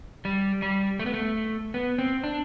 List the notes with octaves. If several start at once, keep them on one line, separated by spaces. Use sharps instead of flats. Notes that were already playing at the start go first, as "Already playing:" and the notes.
G3
G3
A3
B3
A3
B3
C4
D4